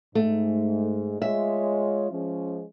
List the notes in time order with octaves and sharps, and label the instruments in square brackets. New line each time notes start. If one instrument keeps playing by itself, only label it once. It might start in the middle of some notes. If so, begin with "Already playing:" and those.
[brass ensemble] G#2 [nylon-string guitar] A3
[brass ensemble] G#3 F4 C#5 [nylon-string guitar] E5
[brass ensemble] F3 G#3 C#4